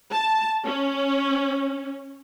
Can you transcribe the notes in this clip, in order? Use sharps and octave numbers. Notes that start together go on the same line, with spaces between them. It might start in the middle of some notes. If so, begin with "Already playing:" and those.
A5
C#4